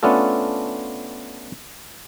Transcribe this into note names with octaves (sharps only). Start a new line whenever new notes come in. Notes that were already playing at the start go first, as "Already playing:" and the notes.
A3 B3 C#4 D4 F4 A4